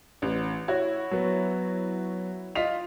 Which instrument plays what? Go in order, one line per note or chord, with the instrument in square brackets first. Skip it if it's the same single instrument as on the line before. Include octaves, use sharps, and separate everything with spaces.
[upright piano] A1
E4 F#4 C#5
[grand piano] F#3 B3
[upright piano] F4 D#5 [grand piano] B6 C7 F7